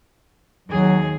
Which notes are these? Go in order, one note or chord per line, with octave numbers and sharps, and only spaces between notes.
D#2 F#3 G#4